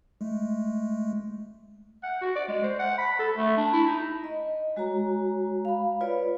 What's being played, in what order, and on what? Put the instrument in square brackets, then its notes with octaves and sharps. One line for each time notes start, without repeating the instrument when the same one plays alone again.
[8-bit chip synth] G#3 A3
[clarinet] F#5
F#4
D5
G#3
C5
F#5
B5
A4
A3
D4
E4
D#4
[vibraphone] D#5
G#3 F#4 C#5 A#5
F5 B5
F4 B4 C#5 D5